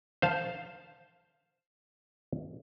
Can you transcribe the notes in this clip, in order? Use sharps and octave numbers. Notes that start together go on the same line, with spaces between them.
C5 F5 A5